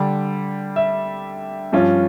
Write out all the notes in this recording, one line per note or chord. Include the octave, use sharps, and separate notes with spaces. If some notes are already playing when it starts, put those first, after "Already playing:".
Already playing: D3 G3 D4
E5
G2 F3 C#4 F4